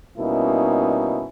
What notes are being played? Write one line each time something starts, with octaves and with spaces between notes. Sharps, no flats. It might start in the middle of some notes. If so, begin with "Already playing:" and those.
B2 G3 A#3 C#4 D#4 E4